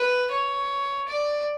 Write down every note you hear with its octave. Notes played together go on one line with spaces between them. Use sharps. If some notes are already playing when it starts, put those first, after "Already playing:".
Already playing: B4
C#5
D5